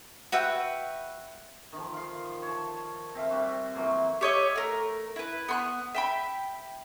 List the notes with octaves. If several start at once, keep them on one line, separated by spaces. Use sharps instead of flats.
F#4 B4 E5 G5
D#3 F3
F5 C6
C#5 A5
C4 E5 F5
G3 C4 F#4
E3 F#3 A#3 C6
G4 C#5 D#5 E5
A3 A#4
E4 B4
B3 C6 F#6
E5 G5 B5